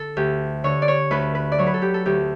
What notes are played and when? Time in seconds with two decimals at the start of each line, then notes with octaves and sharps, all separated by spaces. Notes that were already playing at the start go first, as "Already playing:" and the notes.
Already playing: D3 A4
0.17 D2 G4
0.64 D3 C#5
0.82 D5
0.88 C#5
1.11 D2 B4
1.35 B4
1.52 D5
1.58 F#3 C#5
1.66 B4
1.74 A4
1.82 G4
1.94 A4
2.05 D2 G4